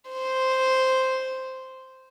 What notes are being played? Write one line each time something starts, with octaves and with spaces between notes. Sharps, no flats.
C5